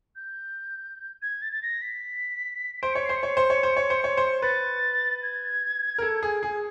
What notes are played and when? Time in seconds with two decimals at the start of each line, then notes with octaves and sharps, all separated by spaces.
0.16 G6
1.22 G#6
1.42 A6
1.52 A6
1.62 A#6
1.82 B6
2.82 C5 D7
2.93 C#5 C#7
3.05 C5 C7
3.16 C#7
3.23 C#5
3.37 C5
3.50 C#5
3.63 C5
3.77 C#5
3.90 C5
4.04 C#5
4.17 C5
4.42 B4 A6
5.23 G#6
5.98 A#4
6.02 A4
6.23 G#4
6.43 G#4